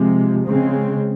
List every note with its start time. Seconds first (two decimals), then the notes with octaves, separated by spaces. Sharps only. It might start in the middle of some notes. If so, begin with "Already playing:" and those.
Already playing: C3 F3 G#3
0.46 C#3 G#3 C4